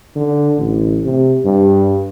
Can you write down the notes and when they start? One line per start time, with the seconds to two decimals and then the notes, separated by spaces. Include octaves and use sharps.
0.15 D3
0.57 A1
1.04 C3
1.44 G2